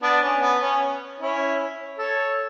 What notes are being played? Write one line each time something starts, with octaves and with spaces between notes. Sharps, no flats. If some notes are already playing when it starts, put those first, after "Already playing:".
B3 D4
C#4
B3
C#4
C#4 E4
A4 C#5